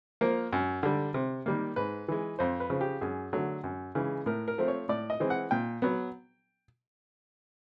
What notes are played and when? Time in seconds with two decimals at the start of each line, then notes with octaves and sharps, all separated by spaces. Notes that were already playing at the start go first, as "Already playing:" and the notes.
0.21 F3 A#3 A#4
0.53 F#2
0.83 D3 G3
1.14 C3
1.46 D#3 G3 A#3
1.76 G#2 B4
2.08 E3 G#3
2.39 F2 C5
2.60 B4
2.70 C#3 F3
2.81 G4
3.01 F#2 G#4
3.33 D3 F#3 A3
3.64 F#2
3.95 C#3 E3 G#3
4.26 A2 A#4
4.48 A#4
4.58 F3 A3 C4
4.68 C#5
4.89 A2 D5
5.10 D#5
5.20 E3 G#3 C4
5.30 F#5
5.51 A#2 G5
5.82 F#3 B3